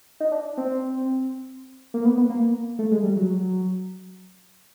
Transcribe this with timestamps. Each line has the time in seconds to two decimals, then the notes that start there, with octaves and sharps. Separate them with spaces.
0.20 D#4
0.32 D4
0.58 C4
1.94 A#3
2.05 B3
2.18 B3
2.30 A#3
2.79 A3
2.91 G#3
3.03 G3
3.16 F#3